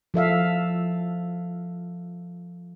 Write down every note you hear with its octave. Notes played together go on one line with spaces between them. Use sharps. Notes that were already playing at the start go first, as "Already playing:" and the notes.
F3 A4 E5 F5